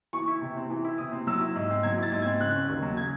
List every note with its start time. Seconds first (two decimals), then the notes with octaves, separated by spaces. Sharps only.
0.13 E3 C#6
0.27 E4
0.41 C3
0.57 C4
0.70 E3
0.85 E4
0.98 C3 D#6
1.12 C4
1.27 F#3 E6
1.41 E4
1.55 G#2
1.70 C4
1.83 F#3 G#6
1.98 E4 A6
2.12 G#2
2.22 G#6
2.26 C4
2.40 C#3 F#6
2.55 C#4
2.69 D#2
2.82 F#3
2.97 C#3 G#6